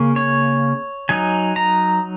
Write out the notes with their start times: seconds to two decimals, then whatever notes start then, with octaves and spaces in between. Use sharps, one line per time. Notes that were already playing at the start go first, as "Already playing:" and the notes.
Already playing: C#3 A#3 C#4
0.16 C#5
1.09 F#3 D#4 G#5
1.56 A#5